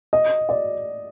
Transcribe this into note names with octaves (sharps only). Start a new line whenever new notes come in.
D#5
D5